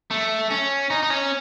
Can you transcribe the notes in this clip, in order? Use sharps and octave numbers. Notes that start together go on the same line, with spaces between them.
A3
C#4
D#4
D#4
C#4